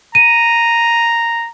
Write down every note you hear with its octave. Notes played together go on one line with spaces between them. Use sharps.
A#5 D#7